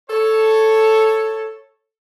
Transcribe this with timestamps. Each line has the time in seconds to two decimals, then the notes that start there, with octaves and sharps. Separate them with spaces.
0.10 A4 C#5